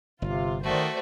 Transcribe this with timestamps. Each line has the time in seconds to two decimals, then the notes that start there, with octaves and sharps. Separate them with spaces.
0.22 G1 C3 F4
0.64 D#3 A3 F#4 C5 D5